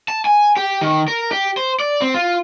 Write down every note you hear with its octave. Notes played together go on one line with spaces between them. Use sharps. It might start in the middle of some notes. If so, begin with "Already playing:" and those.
A5
G#5
G4
D#3
A#4
G4
C5
D5
C4
F4